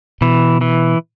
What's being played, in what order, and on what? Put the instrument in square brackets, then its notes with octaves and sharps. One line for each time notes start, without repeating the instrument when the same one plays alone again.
[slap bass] B2 [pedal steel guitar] E3
[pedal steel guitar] E3